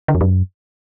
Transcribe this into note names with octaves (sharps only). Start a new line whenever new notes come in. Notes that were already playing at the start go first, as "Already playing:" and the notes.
D3
F2
F#2